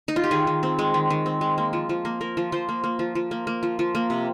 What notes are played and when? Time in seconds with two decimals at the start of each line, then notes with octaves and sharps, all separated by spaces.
0.08 D#4
0.16 F4
0.24 G4
0.31 D#3 G#4
0.47 D#3
0.63 C4
0.79 G#3
0.94 D#3
1.10 D#3
1.26 C4
1.41 G#3
1.58 A#3
1.73 F3
1.89 F3
2.05 A#3
2.21 A#3 A#4
2.37 F3
2.52 F3 C5
2.69 A#3
2.84 A#3
2.99 F3
3.15 F3
3.31 A#3
3.47 A#3
3.63 F3
3.79 F3
3.95 A#3
4.10 C3